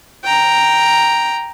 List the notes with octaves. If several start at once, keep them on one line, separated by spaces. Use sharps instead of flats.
G5 A#5